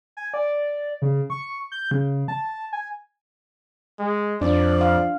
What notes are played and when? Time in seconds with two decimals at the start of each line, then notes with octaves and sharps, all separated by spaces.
0.17 G#5
0.34 D5
1.02 C#3
1.30 C#6
1.72 G6
1.91 C#3
2.28 A5
2.73 G#5
3.99 G#3
4.41 F2 F3 D4 D5
4.81 F5